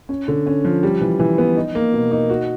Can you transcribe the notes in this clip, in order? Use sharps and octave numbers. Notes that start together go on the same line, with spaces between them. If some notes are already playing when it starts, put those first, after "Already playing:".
C#4
D3
C#4
F3
G3
E3
E3
B3
D#4
A#3
B2
D#4
F#4